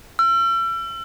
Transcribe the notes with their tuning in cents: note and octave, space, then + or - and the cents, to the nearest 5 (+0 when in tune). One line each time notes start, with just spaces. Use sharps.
E6 +40